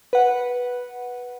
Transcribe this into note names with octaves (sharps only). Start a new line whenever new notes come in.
B4 F#5